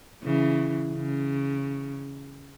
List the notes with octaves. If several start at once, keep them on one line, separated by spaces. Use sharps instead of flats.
C#3 E3
C#3